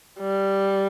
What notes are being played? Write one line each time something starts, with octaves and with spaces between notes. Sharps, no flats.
G3